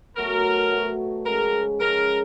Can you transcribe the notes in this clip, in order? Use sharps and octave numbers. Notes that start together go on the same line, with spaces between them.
B2 F#3 A3 A#4
B2 F#3 A3
C#3 F3 G#3 A#4
C#3 F3 G#3 A#4